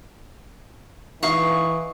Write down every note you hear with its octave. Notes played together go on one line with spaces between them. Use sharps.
E3 D#4 F5 C#6